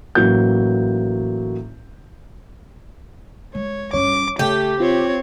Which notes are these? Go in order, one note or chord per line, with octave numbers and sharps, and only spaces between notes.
A1 F#3 A#3 G6
G#3 C#5
G2 C#4 C#5 D6
C#3 A3 G4
C4 F4 C#5